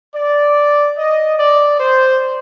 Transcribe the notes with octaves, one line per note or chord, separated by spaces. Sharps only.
D5
D#5
D5
C5